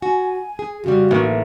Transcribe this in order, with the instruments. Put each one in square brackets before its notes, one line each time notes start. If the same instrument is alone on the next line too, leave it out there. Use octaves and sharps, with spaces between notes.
[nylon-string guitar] F#4 [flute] G#5
[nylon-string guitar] G#4
[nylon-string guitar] F2 C#3 G3 [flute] F#4
[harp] A1 [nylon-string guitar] A#3